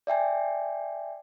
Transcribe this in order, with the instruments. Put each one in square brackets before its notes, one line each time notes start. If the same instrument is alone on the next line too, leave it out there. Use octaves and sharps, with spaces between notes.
[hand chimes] D5 E5 G5 G#5